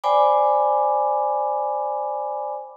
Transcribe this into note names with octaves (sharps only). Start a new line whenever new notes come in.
C5 D5 G5 G#5 B5 D6